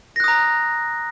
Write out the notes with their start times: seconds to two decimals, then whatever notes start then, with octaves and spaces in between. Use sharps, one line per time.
0.16 A#6
0.20 F#6
0.24 D#6
0.28 A#5